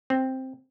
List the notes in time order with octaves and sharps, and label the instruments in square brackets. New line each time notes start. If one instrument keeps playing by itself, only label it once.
[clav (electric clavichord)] C4